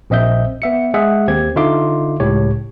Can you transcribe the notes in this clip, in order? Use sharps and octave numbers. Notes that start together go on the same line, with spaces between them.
A#1 C4 D#5 E5 G6
B3 E5 C#7
G#3 G#4 E5 F#5
D#2 C4 G4 G#6
D3 D#4 F4 E5 C6 D6
C#2 A2 G4 C#5